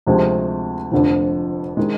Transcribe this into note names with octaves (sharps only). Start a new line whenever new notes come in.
D2 C3 F3 G#3 C4
F1 F2 D3 F3
D#3 G#3